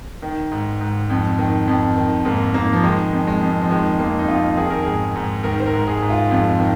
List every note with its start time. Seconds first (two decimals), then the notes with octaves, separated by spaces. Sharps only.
0.22 D#3
0.52 G#2
0.81 G#2
1.10 F2
1.38 D#3
1.68 F2
1.97 D#3
2.25 G#2 A#3
2.54 G#2 A#3
2.73 F3
2.84 D#3 G#3
3.13 F2
3.27 G#3
3.41 F2
3.61 F3
3.70 D#3 G#3
3.99 F2 A#3
4.18 D#4
4.28 F2 F4
4.57 D#3 G#4
4.70 A#4
4.83 G#2 G#4
5.16 G#2
5.44 D#3 A#4
5.60 C5
5.66 A#4
5.73 G#2
5.87 G#4
6.02 G#2
6.10 F4
6.31 F2
6.60 D#3